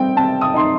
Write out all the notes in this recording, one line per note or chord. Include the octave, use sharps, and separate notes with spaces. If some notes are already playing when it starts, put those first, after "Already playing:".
Already playing: G3 C4 G5
C4 A5
D#6
D#4 C6